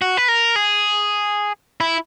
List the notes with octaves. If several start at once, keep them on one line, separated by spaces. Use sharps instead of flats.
F#4
B4
A#4
G#4
E4